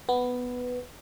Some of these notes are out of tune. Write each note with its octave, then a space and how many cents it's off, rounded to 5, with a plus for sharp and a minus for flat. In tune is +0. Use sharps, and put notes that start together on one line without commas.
B3 +5